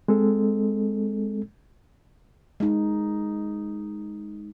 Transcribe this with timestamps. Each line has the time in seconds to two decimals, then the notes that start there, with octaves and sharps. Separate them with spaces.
0.08 G#3 C4 A4
2.60 G#3 D#4